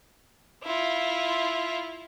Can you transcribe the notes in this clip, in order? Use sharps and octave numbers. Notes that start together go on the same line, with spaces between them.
E4 F4